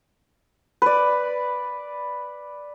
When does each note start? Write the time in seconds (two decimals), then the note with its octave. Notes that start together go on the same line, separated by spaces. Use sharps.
0.82 B4 D5